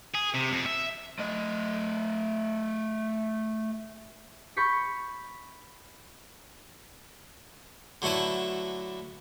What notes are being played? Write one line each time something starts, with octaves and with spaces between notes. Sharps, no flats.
G#4
C3
F2
E5
A3 D#5
B5 C#6 G6 A6 B6 C#7
D3 F#3 A3 E4 B4